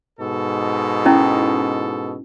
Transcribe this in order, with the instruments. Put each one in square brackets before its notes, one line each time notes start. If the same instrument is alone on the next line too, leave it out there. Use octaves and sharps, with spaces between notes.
[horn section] G#2 B2 A4
[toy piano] C#4 D#4 E4